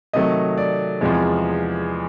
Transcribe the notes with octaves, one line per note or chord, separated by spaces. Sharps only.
C3 D#3 F#3 A3 D#5
D5
E2 C3 F3 G#3